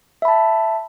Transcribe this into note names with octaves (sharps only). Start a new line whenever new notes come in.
E5 A5 B5